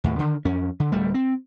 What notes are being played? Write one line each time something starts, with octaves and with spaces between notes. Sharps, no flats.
D#2 A2
D3 D#3
F2 C#4
D3
D1 G3 A3
C4